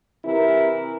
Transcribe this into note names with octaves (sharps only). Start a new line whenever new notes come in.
C3 E3 E4 A#4